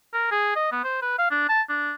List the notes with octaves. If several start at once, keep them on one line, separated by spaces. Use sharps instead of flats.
A#4
G#4
D#5
B3
C5
B4
F5
D4
A5
D4